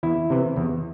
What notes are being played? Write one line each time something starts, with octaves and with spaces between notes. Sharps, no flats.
E2 E4
C3 E3
E2